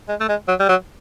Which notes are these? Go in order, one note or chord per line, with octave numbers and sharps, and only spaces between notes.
G#3
A3
G#3
F#3
G3
F#3